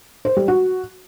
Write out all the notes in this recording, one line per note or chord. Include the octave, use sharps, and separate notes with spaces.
C5
G3
F#4